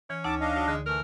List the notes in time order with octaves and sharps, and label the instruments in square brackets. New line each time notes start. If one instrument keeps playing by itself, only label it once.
[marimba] E3 [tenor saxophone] C#4
[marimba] D2 D#4 E6 [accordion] A5 D6
[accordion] D4 D#5 F5
[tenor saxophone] F#3
[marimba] D3 [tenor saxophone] G#3
[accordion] E3 A3 [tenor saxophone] A#4